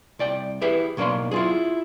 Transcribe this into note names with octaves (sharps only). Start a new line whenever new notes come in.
C2 D5 G5
E4 G4 G#4 B4 E5
B1 F#3 A#3 D4 B5 C6
E4 F4 G#4